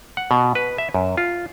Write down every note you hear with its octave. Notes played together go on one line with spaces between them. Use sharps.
F#5
B2
B4
E5
F#2
F4